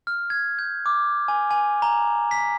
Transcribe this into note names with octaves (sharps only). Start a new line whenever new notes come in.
F6
G#6
G6
D6
G#5
G#5
A#5
B6